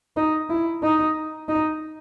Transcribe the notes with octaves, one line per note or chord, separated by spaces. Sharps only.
D#4
E4
D#4
D#4